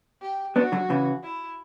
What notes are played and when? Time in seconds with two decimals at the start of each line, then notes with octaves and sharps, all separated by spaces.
0.22 G4
0.56 B3 D4 F#4
0.72 D3 F#3
0.90 C#3 E3
1.23 E4